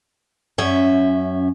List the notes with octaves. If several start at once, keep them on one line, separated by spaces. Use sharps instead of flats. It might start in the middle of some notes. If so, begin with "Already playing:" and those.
F#2 C#4 E5